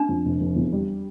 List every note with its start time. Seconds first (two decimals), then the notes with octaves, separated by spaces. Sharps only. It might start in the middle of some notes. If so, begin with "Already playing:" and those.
Already playing: D4
0.09 F2
0.25 F1
0.40 F1
0.56 E2
0.72 G3